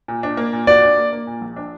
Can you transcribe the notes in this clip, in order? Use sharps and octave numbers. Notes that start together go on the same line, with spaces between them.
A#2
D4
A#3
A#2
F#4 D5
D4
A#3
A#3
A#2
A#1
D4